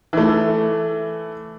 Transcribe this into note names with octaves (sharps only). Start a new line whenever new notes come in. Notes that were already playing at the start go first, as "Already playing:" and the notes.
E3 A3